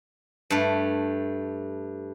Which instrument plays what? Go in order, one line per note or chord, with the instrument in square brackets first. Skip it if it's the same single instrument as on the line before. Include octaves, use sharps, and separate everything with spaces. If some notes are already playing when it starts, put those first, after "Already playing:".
[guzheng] G2 A3